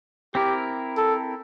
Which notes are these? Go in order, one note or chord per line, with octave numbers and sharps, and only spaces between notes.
C4 E4 G4 A#4
A4